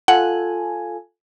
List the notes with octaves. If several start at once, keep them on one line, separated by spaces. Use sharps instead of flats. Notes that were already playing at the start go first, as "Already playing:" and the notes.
F4 A4 F#5 G#5